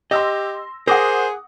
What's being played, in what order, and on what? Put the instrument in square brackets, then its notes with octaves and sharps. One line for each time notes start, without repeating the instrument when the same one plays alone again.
[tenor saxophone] G4 [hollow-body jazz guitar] D#5 [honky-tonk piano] C6 E6 A#6
[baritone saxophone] G#4 [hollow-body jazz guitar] A#4 [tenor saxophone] C5 [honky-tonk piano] F#5 D6 D#6